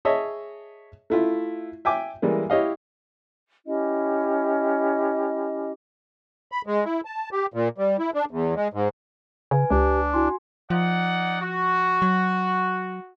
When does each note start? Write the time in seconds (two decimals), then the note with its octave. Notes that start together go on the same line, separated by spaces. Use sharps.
0.05 G#4 C#5 D#5 E5 A5
1.10 A3 E4 F4
1.85 E5 G5 G#5 D6
2.22 E3 G3 G#3 A#3
2.50 E4 G4 C#5 D#5 F5
3.66 C#4 E4 G4 D#5
6.52 B5
6.67 G#3
6.85 E4
7.05 A5
7.32 G4
7.54 A#2
7.78 G3
7.99 E4
8.14 D4
8.31 E2
8.56 G#3
8.73 G#2
9.51 C#3 B4 G#5
9.70 C#2 D4 G4
10.14 E4 F#4 G#5 C6
10.70 F3 D#4 D5 F#5
11.41 F#4
12.02 F#3